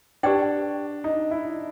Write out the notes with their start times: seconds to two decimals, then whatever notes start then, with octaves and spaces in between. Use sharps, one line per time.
0.23 D4 G4 B4 D5 G5
1.04 D#4
1.31 E4